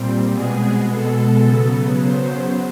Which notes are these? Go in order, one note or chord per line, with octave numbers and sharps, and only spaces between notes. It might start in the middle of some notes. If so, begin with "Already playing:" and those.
Already playing: A#2 G3 C4
B2 G#3 B3 G#4
A4
C#3 F#3 B3
C5